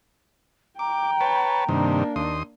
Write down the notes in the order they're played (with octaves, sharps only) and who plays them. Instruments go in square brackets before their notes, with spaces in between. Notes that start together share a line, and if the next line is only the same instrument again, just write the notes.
[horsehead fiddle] G5 [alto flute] A#5 [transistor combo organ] D6
[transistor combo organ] B4 C#5 A5
[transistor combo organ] G2 C3 D#3 [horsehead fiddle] A#3 D4
[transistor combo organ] D#2 C6 D#6